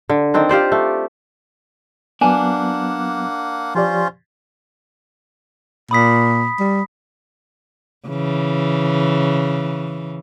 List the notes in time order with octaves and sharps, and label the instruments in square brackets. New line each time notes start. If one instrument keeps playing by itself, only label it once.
[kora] D3
D#3 C4 D4
F4 G4 C5 D5
A3
[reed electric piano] F#3 B3 [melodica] A#3 F#5 [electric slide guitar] D4 [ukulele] G#5
[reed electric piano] F3 G4 D5 [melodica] C#4 F4 C5
[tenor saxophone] A#2 [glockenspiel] B5 D#6 B6
[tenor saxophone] G3
[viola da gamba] C#3 E3